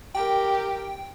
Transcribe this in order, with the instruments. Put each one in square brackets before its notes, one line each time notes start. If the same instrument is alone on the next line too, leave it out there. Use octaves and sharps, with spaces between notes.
[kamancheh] G4 A#4 [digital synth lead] G5